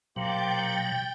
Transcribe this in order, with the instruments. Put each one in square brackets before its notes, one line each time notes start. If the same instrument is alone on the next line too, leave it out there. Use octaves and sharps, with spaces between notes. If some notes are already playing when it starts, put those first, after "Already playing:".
[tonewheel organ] B2 F#3 [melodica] A#3 G4 C5 [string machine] G5 G6 A6